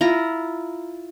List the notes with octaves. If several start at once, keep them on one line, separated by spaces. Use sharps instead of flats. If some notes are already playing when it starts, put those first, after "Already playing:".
E4 F4 A#5